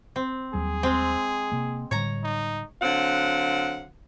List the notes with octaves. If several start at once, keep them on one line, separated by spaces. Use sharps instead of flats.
C4
D#2 F#3 G3 G#4
G#3 C4
C3 A#3
A2 D3 G3 C#5 A#5
D#4
D3 F#3 C4 F5 F#5